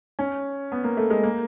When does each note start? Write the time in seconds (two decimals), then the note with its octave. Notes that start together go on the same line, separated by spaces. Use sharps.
0.19 C#4
0.72 B3
0.84 A#3
0.97 A3
1.10 G#3
1.23 A#3